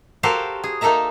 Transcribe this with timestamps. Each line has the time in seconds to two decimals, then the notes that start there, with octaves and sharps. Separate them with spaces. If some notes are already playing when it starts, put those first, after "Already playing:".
0.23 F#4 G4 A4 A#4 C5 F5
0.64 G#4
0.81 A#3 D#4 A4 A#4 E5 A#5